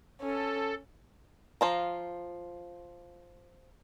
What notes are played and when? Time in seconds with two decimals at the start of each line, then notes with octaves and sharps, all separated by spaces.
0.22 C#4 A4
1.61 F3 F4 A#5